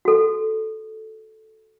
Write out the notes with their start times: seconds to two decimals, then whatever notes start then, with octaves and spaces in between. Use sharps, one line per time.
0.05 F#4 A4